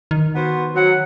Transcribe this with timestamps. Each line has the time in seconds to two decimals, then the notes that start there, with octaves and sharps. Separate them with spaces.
0.11 D#3
0.35 B3 F#4 C5
0.75 F#3 F#5